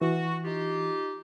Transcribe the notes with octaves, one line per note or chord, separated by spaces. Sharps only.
E3 F#4
D#4 F4 G4